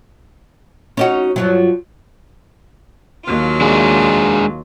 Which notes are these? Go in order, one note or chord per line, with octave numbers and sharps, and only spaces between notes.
C#4 D#4 F#4
G2 F3 F#3
D#2 F#3 F4
G#3 D4 G#4